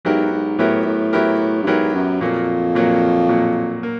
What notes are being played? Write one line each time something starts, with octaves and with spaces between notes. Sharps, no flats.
G#2 F#3 B3 E4 G4 A#4
G#2
A2 F#3 B3 E4 G4 A#4
A2
F#3 B3 E4 G4 A#4
G2
G#2 F#3 B3 E4 G4 A#4
F#2
F2 A#2 F#3 A#3
A#2 F#3 A#3
A#2 F#3 A#3
A#3